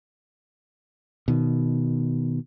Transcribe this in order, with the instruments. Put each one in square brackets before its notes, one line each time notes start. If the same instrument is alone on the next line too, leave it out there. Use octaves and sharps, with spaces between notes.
[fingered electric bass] B2 D#3